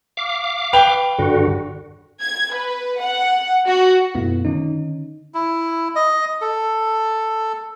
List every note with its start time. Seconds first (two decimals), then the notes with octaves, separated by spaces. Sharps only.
0.17 F5 D6
0.73 B4 G5 F7
1.19 G2 D3 F#4
2.21 G#6
2.54 B4
3.01 F#5
3.67 F#4
4.15 F#2 B2 A3 B3 E4 F4
4.45 D3 D#3 C#4 D#4
5.34 E4
5.96 D#5
6.41 A4